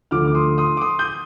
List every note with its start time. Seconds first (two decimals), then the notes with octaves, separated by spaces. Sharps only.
0.11 D2 D3 F3 D6 F6
0.27 D6
0.35 C6 D#6
0.58 C6 D#6
0.77 D6
0.81 C6 D#6
0.99 D#6 G6